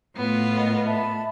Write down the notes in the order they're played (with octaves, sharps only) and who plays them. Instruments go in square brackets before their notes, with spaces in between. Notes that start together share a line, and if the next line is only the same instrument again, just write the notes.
[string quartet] A2 B3 F4
[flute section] A#4 D#5
E5 A5 B5